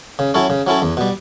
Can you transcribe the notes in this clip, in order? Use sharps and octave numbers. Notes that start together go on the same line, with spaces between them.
C#3
F#3 C#4 E4 A4
C#3
F#3 C#4 E4 A4
E2
B2 G3